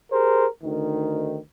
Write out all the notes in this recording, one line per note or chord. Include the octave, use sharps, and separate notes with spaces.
G4 G#4 A#4 C5
D2 D#3